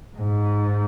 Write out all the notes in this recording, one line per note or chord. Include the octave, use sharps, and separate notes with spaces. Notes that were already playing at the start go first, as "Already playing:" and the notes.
G#2